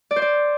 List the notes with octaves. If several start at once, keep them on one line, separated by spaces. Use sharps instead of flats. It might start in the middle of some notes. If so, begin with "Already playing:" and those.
D5
C5
D5